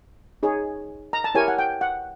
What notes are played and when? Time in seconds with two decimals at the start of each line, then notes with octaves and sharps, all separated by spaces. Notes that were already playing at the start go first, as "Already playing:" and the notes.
0.43 D#4 G#4 C#5
1.13 A#5
1.24 A5
1.35 E4 G4 A#4 C#5 G#5
1.48 F#5
1.59 G5
1.81 F#5